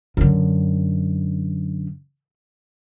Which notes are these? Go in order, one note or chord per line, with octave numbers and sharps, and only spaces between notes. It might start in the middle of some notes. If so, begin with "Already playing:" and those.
F#2 D3